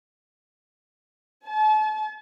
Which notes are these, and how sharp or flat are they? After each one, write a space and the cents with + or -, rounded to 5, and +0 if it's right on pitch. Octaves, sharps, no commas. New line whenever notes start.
A5 -40